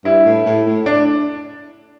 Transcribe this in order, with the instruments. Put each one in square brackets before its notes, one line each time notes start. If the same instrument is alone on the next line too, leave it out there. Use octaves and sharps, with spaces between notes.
[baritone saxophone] G2 [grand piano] E4
[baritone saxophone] A2
A2
A2
[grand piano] D4